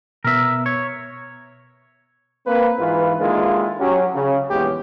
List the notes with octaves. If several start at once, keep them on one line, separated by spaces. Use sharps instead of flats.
B2 B3 A#4 E5
C#5
A#3 C4 B4
G#2 E3 F4 B4
D3 D#3 G#3 A#3 E4 F4
F#3 C#4 G4
C#3
A#1 E2 G#3 B3 C#4 G4